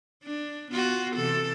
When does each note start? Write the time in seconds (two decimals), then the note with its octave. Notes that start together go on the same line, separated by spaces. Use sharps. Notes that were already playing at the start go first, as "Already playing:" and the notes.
0.23 D4
0.72 B3 F4 F#4
1.16 C3 E3 A4